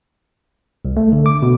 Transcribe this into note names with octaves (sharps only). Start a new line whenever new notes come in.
C2
A3
D3
D6
B2